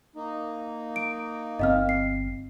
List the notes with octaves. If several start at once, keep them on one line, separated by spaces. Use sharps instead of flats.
A#3 D#4
D7
G1 A#2 C4 D#5 F5 F6
C7